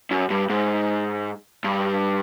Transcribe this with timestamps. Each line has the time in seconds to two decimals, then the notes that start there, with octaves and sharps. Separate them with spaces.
0.11 F#2
0.30 G2
0.50 G#2
1.64 G2